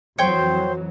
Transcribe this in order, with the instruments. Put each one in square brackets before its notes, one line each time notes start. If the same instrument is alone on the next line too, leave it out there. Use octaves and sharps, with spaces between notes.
[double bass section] F2 E3 F#3 [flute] C5 [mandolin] C#5 G5 G6